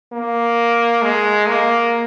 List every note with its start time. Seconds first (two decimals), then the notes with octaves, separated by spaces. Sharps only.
0.12 A#3
1.02 G#3
1.47 A#3